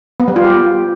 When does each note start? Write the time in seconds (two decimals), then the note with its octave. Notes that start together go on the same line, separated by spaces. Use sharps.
0.20 B3
0.28 G3
0.36 F4
0.44 G4